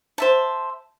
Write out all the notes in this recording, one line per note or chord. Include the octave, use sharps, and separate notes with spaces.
C5 E5 A5